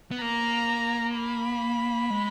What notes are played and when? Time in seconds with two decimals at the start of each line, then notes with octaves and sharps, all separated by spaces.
0.11 B3
0.22 A#3 A#5
1.16 B5
2.10 G#3